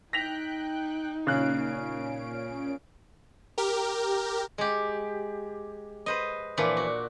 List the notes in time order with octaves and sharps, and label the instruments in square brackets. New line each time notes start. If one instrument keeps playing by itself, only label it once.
[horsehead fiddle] D#4 [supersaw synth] G5 F#6 [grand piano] A#6 B6 F7
[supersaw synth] A#2 C#4 D7 [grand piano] C#3 F#6
[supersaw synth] G4 A#4
[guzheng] G#3 G4
B4 C5 D#5
A#2 E3 F3 D4
F#4